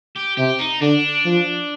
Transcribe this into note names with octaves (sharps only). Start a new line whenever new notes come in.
G4
C3 G4
D#4
D3 D4
F3